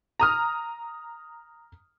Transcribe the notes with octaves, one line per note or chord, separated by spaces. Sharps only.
A#5 D#6 F6